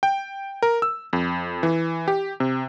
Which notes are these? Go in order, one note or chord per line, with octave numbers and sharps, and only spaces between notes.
G5
A#4
E6
F2
E3
G4
C3